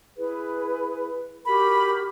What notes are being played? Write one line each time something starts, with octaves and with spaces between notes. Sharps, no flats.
E4 G#4 B4
F#4 G4 A#4 B5